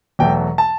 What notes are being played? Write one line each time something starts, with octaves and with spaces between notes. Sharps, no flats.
E2 B2 F#3 A3 G5
A5